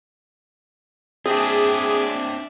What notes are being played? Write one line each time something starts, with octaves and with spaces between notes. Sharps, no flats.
C4 D4 G#4 D5 E5